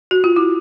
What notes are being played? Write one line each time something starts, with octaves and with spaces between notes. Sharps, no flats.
F#4
F4
E4